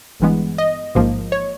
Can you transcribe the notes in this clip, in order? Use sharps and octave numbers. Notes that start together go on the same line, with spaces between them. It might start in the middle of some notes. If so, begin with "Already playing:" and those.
G1 G2 E3 G#3 B3
D#5
A1 G#2 F3 A#3
C#5